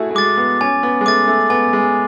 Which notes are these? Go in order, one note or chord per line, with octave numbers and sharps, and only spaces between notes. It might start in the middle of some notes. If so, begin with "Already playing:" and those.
Already playing: A3 E4 F#4 G#4
A3
G#3 D6 A6
B3
C#4 G#5
B3
G#3
A3 D6 A6
A3
B3 G#5
G#3